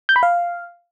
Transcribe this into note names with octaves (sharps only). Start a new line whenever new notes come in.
G6
B5
F5